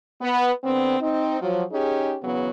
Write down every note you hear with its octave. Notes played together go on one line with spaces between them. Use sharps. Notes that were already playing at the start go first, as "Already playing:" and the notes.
B3
D3 B3 C4
C4 D#4
F3 F#3
C#4 D#4 G4 G#4
E2 C#3 F#3 B3